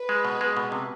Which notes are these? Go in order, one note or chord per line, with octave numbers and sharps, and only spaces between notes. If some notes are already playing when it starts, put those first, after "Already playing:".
Already playing: B4
G#3
B2
G#3
B2
C3